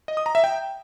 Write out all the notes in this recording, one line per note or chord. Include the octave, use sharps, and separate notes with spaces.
D#5
D#6
A#5
E5
G5